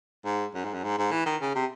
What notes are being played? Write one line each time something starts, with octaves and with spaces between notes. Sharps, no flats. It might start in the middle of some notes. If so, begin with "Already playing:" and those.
G#2
F#2
G#2
F#2
G#2
G#2
E3
D#3
C#3
C3